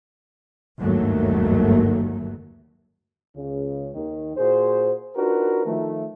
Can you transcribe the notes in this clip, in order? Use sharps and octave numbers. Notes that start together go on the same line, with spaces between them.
G1 D#2 G#2 F#3 A3 A#3
C#2 C#3
D#2 D#3
A#2 F#4 G#4 C5
D4 D#4 F4 F#4 A#4 B4
D#3 F3 A3